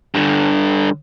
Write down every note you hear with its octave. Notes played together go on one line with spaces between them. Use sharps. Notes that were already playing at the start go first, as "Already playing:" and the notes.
G2 D3